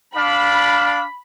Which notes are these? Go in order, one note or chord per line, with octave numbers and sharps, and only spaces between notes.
D4 F5 B5